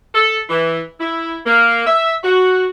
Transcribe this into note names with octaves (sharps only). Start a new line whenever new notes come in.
A4
E3
E4
A#3
E5
F#4